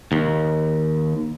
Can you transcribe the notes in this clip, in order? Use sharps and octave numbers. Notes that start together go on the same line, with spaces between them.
D#2